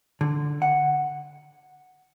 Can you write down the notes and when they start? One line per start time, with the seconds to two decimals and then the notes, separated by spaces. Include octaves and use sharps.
0.21 D3
0.62 F#5